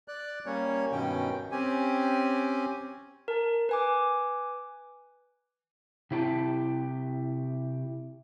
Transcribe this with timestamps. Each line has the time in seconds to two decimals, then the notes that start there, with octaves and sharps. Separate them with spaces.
0.08 D5 F#6
0.46 G3 A#3 C#4 C#5
0.92 G2 B2 D#3 C#4 G5
1.52 C4 C#4 G4 G#5
3.28 A#4 A5
3.69 B4 G#5 D6
6.11 C3 E4 G4 A5